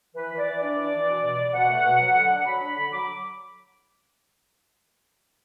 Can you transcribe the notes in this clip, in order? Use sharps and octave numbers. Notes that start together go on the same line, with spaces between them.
E3 B4
E3
D5
E3
D4 D5
E3
E3
B2
B2
B2
B2 F#5
A3
B2
F#3
D3
D4
F#3 B5
D4
D3
F#3 D6